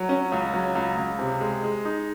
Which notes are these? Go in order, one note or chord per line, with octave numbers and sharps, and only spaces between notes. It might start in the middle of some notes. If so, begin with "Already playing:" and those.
Already playing: F#3
C#4
C#2
F#3
C#2
C#2
C3
G#3
G#3
D#4